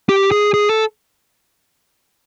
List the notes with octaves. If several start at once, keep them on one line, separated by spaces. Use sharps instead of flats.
G4
G#4
G#4
A4